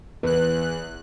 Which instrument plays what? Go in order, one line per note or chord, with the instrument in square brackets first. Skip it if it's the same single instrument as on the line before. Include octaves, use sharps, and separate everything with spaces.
[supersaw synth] E2 F#6 [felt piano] B4